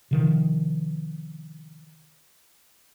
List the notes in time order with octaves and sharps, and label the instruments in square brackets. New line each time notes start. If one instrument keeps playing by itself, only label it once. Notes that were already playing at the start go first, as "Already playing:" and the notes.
[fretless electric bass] C3 D#3 F3